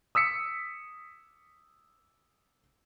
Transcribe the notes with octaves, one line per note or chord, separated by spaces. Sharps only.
D#6 E6 B6 C#7